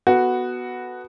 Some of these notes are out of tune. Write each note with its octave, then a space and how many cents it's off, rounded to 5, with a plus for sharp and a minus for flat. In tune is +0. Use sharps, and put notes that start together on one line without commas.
B3 +0 F#4 +0 A4 +0